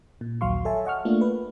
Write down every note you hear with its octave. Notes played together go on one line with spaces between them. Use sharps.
A#2
A#1 D#2 F#3 F5 C6 C#6
A4 C#5 E5 G#5 A5
D#5 F#5 C#6 F6
A3 A#3 D4 F4
B4